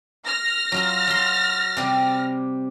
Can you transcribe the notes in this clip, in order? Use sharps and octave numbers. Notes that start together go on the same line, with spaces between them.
F6 A#6
F#3 F4 A#5
F#3 C6
C3 G3